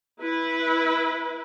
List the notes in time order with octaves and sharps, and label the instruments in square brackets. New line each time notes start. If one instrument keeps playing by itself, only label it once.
[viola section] E4 B4